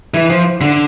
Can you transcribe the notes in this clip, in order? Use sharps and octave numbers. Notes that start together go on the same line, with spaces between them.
E3
F3
D3